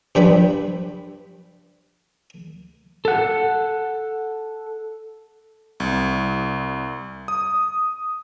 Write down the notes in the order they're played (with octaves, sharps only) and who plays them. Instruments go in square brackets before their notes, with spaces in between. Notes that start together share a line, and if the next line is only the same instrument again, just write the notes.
[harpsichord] G2 F3 G3 B4
[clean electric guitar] A4 F#5
[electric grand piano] C2
D#6